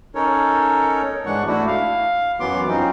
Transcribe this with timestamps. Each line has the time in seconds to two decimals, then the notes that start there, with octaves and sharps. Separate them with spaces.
0.15 C#4 D#4 A4 A#4 C#5
1.26 G#2 E3 G#3 D4 F#5 C#6
1.47 A3 D4 E4 F#4
1.67 F5
2.40 F#2 E3 F#3 B3 C6 D6
2.68 F3 F#3 C4 C#4 D#4